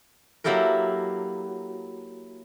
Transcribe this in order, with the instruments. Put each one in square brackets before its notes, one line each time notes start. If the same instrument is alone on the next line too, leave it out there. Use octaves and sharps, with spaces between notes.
[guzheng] F#3 A#3 E4 G4 A4 A#4